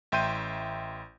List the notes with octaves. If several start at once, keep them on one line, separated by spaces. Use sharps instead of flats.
A1 E5 G5 C6 G6 D#7